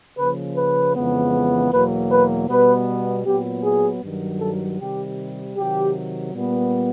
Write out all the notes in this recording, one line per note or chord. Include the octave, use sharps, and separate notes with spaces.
C#3 F3 A#3 B4
B4
F2 C#3 E3 G#3 B3
E2 B2 F#3 A#3 B4
B4
B2 G3 B3 B4
A#2 F#3 B3 G4
G#4
G2 D#3 F#3
A4
C3 D#3 G3 G4
C3 D#3 F#3 G4
A#2 G3 B3